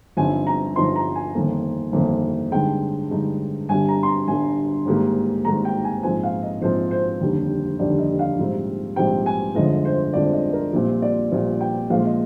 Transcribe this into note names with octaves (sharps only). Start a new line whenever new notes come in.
G1 G2 F3 C4 D#4 G#5
A#5
G1 G2 F3 C4 D#4 C6
A#5
G#5
G1 F2 D#3 A#3
G1 F2 D#3 A#3
G2 D3 G#3 D#4 G5
G2 D3 G#3 D#4
G1 G2 D3 G3 G#5
A#5
C6
A#5
G1 G2 D3 G3 G#5
G#1 G#2 G3 A#3
G#1 G#2 G3 A#3 A#5
G5
G#5
A#1 G#2 F3 C4 G#5
F5
D#5
A#1 G#2 F3 C4 C5
C5
F1 D#2 D3 G3
F1 D#2 D3 G3 D5
D#5
F5
A#1 G#2 G3 C4 D#4
A#1 G#2 G3 C4 D#4 G5
G#5
G1 F2 D3 F3 G#3 D#5
C5
G1 F2 D3 F3 G#3 D5
D#5
A#4
A#1 A#2 G3 C4
D5
A#1 A#2 G3 C4
G5
A#1 A#2 F3 G#3 F5
D#5